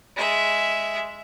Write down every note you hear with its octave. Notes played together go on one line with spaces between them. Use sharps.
G#3 E5